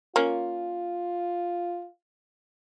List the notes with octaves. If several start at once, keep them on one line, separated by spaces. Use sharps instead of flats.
A#3 C#4 F4